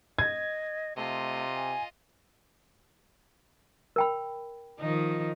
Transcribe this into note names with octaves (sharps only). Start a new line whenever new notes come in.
D#5 G#6
C3 A3 F4 D#5
G#5
A#4 G5 B5
D#3 F3 D#4